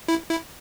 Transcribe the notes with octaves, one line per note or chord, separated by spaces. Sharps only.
E4
E4